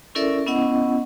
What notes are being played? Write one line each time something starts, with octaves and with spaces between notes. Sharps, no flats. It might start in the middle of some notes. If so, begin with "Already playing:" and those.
C#4 E4 A4 A#4 D5 E5
B3 C#4 E4 D#5 F#5